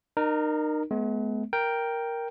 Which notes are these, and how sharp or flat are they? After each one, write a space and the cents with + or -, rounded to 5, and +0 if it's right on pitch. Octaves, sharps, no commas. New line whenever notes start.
D#4 -35 A#4 +0
G#3 +45 B3 +0
A#4 +0 G5 +0